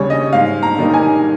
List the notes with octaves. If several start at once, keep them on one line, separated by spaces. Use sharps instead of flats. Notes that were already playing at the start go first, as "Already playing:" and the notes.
Already playing: D#2 C#3 G3 C#5
D#5
G#2 F5
A#5
D#3 G3 A#3 D#4
G#5